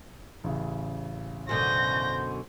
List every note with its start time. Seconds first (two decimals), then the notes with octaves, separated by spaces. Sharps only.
0.44 A1 C#3
1.49 F#2 B2 D3 C5 G6 A#6